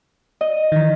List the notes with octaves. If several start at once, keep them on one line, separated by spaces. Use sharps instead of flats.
D#5
D#3 E3